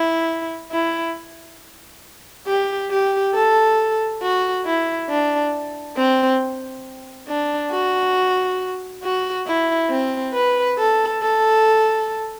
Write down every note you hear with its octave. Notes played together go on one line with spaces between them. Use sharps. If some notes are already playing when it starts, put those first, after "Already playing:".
Already playing: E4
E4
G4
G4
A4
F#4
E4
D4
C4
D4
F#4
F#4
E4
C4
B4
A4
A4